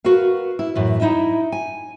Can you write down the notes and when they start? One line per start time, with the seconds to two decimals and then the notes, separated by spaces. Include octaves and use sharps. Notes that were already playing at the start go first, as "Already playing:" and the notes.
0.04 F#4 A#4 B4 F5
0.59 E4
0.75 F#2 A2 E3
1.00 D#4 E4 D#5 E5
1.52 G#5